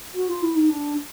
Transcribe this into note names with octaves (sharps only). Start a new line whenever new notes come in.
F#4
F4
E4
D#4
D4